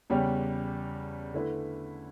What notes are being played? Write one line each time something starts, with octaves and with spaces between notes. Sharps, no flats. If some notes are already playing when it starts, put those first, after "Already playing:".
E2 C#3 G3 C#4 G4
D3 A3 E4 B4